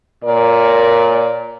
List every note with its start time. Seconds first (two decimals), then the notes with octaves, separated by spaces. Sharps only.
0.24 A#2 A#4 C#5 D5